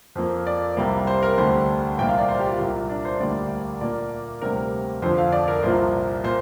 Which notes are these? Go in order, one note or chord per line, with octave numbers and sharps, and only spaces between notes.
F2 F3 A#3
D5
C2 C3 G3 A#3
C5
A#4
D2 D3 G3 C5
C2 A#2 F3 A#3 G5
F5
D5
C5
G4
F4
C2 A#2 A#3
D4
C5
D2 D3 G3 A#3 D5
A#2 A#3 D5
D2 C3 G3 A#3 A#4
A#4
F2 D3 F3 C5
F5
D5
A#4
C2 A#2 F3 A#3 C5
A#2 A#3 C5